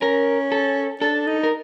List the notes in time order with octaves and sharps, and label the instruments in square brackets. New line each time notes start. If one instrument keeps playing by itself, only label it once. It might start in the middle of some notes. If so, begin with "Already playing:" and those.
[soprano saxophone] C#4 [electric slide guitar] A#4
[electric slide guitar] A4
[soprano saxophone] D4 [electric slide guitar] A4
[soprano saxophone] D#4
[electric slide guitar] A#4